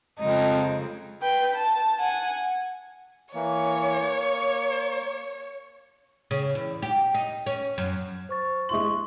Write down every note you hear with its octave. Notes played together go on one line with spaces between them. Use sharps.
F2 C#3 G#3 D#4
B4 G5
A5
F#5 G#5
E3 A#3 C#5
A#3
C#3
E2
G4
D#4
C#4
F#2
C5 C#6 A6
G#3 E4 C6 C#6 F#7